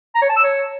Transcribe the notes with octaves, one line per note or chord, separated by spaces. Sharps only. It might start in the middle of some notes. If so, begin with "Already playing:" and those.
A#5
C#5
A5
E6
C#5